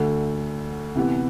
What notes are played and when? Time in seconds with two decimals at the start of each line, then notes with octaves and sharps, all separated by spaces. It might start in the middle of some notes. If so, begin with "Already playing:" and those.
Already playing: D2 D3 A3
0.95 C3 E3 B3